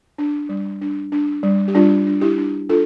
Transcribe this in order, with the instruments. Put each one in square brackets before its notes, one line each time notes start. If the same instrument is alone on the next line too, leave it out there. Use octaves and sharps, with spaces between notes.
[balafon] D4
G3
D4
D4
G3
G4
G3 D4 F4
D4
E4 G4
D4
D4 F4 A4